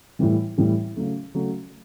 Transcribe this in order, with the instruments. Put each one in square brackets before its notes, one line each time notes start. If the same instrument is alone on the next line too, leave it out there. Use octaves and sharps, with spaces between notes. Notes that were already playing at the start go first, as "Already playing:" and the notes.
[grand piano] A2 E3 G3
A2 E3 G3
C#3 F#3 A3
C#3 F#3 A3